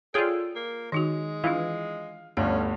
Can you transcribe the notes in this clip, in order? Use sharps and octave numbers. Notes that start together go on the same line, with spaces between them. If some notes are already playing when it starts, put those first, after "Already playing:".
F4 G#4 A4 C#5 D5 G5
A#3
D#3 G#3 D#4 F#4
E3 D4 F4 F5
G1 D2 G2 C#4 F5